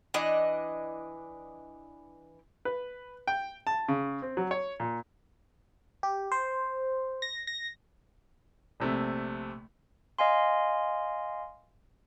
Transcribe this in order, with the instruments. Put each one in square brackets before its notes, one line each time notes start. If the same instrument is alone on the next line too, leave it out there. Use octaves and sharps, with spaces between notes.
[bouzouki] E3 D4 D#5
[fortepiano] B4
G5
A5
C#3
C4
F#3
C#5
A#2
[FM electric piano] G4
C5
A#6
A#6
[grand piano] A#1 C3 A3
[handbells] D#5 F5 G#5 C6